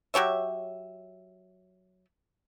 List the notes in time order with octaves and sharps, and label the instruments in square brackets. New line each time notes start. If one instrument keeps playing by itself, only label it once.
[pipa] F#3 G4 C#5 E5